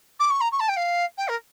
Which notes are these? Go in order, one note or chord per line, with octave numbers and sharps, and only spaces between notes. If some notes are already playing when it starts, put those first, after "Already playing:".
D6
C#6
A#5
C#6
A5
G5
F5
G5
A#4